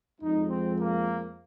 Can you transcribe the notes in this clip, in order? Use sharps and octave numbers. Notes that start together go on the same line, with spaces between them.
F2 F3 G#3 D#4
C4
A#3